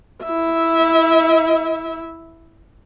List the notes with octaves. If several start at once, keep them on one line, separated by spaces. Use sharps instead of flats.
E4 E5